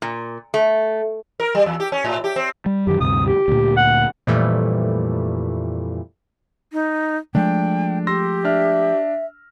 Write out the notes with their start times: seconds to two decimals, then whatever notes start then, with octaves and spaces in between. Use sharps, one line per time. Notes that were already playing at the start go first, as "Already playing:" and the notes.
0.02 A#2
0.54 A3
1.40 A#4
1.55 G3
1.66 E2
1.80 G4
1.92 C#4
2.05 A2
2.24 G4
2.36 C4
2.66 G3
2.87 F#2 D#3 G4
3.00 D2 G2 C3 D#6
3.26 G4
3.48 D2 A#2
3.77 F#5
4.27 F2 A#2 E3 G3 A3
6.73 D#4
7.35 F3 G#3 A3 D4 G5
8.07 G4 C6 E6 A#6
8.45 D4 E5 F6